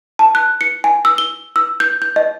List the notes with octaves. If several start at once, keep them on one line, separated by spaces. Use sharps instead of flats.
A5
F#6
C#7
G#5
E6
G7
E6
G6
G6
D#5